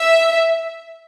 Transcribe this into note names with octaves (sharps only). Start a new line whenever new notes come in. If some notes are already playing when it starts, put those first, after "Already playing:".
Already playing: E5